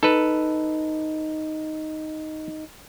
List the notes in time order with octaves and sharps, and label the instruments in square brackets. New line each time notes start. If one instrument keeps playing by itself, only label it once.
[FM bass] D#4 [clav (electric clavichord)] A4 B4